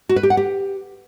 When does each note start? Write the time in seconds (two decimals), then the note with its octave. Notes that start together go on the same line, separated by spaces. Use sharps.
0.09 F#4
0.16 B4
0.23 G4
0.30 F#5
0.37 G4